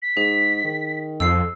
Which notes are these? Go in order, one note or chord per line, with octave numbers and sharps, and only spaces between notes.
B6
G#2 G#4
D#3
F2 E6 C7